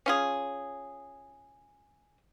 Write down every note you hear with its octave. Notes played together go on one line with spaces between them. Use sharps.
C#4 F4 G#4